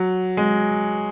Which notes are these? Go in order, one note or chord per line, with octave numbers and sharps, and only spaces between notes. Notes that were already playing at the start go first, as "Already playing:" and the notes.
Already playing: F#3
G#3